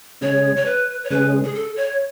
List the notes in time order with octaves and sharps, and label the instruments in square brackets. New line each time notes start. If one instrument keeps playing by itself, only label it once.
[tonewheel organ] C#3 G#3 C#4 G#4 [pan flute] C#5
[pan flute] C#5
B4
C#5
[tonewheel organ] C#3 G#3 C#4 G#4 [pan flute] B4
[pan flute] G#4
A4
C#5